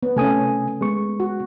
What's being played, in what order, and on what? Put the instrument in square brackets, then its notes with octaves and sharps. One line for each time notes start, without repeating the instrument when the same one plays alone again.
[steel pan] B3
[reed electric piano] C3 G#5 D#6 [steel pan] A3 C#4
[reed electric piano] G#3 B3 C#6
[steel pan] F#4